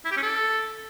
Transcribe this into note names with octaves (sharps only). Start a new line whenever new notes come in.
E4
G4
C#4
A4